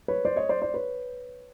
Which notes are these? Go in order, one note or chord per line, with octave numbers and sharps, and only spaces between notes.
B4 C#5
C5 D5
C#5 D#5
C5 D5
C5 D5
B4 C#5